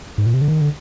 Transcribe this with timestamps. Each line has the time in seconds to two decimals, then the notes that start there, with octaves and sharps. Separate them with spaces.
0.18 G#2
0.26 A#2
0.34 C3
0.41 D3
0.48 D#3
0.61 D3